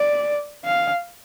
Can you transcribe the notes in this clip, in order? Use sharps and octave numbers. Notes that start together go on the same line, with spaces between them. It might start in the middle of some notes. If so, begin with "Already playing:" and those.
Already playing: D5
F5